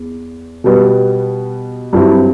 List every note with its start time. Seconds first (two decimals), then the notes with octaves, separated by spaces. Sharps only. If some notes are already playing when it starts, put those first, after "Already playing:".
Already playing: E2
0.64 B2 G3 B3
1.93 G2 F#3 C4 E4